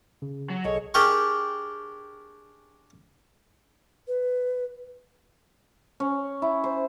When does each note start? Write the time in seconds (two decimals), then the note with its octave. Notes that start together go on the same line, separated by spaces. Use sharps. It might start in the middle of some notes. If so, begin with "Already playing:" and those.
0.22 C#3
0.50 F#3
0.65 B1 G#4 A4 C#5 D#5
0.94 D4 G4 G#4 A#4 G5 C#6
4.08 B4
6.00 C#4
6.42 E4
6.64 C5